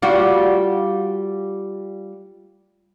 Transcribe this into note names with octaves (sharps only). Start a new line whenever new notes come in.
G3 F4 F#4